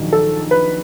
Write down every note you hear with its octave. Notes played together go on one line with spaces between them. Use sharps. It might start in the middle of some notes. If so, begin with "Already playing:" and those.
Already playing: A#1 G#2 D#3 F#3
A4
B4